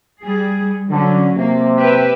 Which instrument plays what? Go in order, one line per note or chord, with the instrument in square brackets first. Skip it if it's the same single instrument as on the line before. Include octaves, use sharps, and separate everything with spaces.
[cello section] G3 G#4
[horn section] D3 [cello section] F#3 C#4
[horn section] C3 [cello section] A#3
[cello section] G4 B4 E5